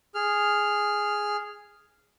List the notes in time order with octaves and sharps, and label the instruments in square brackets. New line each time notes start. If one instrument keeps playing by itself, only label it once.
[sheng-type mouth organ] G#4 F6